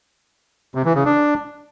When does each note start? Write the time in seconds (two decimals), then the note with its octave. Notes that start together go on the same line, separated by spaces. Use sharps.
0.75 C3
0.85 E3
0.95 C#3
1.05 D4